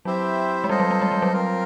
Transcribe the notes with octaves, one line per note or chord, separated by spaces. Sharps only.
F#3 C4 E4 G4 C5 E5
G#3
G3 C4 F4 A4 C5 D#5
F#3
G3
G#3
G3
F#3
C4 F4 A#4